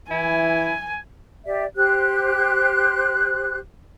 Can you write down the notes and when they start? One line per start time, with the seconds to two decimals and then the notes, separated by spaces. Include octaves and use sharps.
0.11 E3 E4 G#5
1.45 G4 D5 E5
1.76 G4 C5 F#6